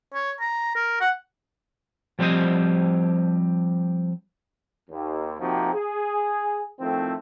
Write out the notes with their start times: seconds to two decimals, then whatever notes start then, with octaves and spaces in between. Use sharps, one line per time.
0.14 C#5
0.40 A#5
0.76 A#4
1.01 F#5
2.19 F3 G3 C4 G4 C5 D#5
4.90 D#2
5.40 C3 F3 A#3 C4 D#4 F#4
5.74 G#4
6.80 A2 D#3 F3 A3 C4